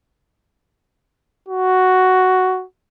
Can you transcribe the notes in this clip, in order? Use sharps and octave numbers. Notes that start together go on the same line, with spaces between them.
F#4